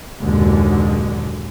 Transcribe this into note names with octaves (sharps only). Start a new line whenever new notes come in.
F#1 D#2 A#2 D3 G#3